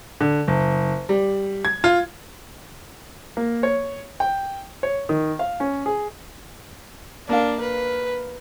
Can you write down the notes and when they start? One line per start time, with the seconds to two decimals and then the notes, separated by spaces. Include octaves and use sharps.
0.21 D3
0.48 F#1
1.09 G3
1.65 G#6
1.84 F4
3.37 A#3
3.63 C#5
4.20 G5
4.83 C#5
5.09 D#3
5.39 F5
5.60 C#4
5.86 G#4
7.29 A#3 D4 F5
7.61 B4